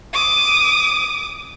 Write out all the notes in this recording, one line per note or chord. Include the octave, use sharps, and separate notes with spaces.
D6 D#6